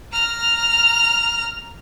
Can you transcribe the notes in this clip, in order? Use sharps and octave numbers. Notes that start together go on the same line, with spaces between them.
A#5 F6